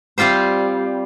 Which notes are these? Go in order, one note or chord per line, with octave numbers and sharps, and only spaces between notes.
G3 C4 F4 G4 C5